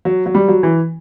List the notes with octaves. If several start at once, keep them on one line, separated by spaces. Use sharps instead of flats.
F#3
F#3
G3
F#3
E3